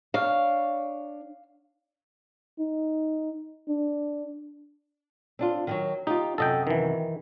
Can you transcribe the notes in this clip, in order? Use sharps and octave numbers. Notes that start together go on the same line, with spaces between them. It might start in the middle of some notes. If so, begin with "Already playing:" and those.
D4 C#5 F5
D#4
D4
C4 D4 F4
D#3 F3 F#3
D#4 F4 G4
F#2 C3 A4 D#5 G5
D#3 E3